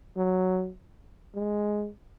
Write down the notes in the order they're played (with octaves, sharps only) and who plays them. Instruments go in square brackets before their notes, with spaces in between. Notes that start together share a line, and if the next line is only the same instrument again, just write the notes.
[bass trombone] F#3
G#3